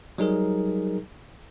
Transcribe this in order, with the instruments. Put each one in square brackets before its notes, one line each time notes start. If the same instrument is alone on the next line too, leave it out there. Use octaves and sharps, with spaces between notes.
[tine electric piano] F#3 G3 D#4 G#4 A#4